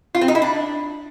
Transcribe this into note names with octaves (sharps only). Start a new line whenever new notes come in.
F4
C4
D#4
E4
D4